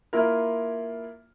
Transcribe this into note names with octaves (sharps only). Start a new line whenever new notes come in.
A#3 E4 F4 A#4